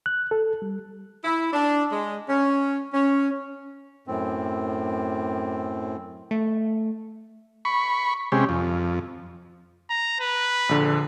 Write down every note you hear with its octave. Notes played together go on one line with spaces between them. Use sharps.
F#6
A4
G3
E4
D4
G#3
C#4
C#4
F#2 A2 C4
A3
B5 C#6
C3 G#3 C#4 G4
F2
A#5
B4
A#1 D3